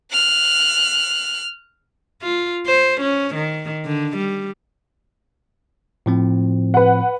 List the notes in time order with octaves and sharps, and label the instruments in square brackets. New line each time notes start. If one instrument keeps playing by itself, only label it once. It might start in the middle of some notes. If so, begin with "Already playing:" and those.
[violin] F6 F#6
[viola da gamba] F4
C5
C#4
D#3
D3
G3
[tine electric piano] A2 F3 C4
[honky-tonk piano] B4 F#5